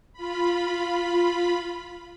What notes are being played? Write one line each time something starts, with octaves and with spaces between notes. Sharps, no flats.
F4 B5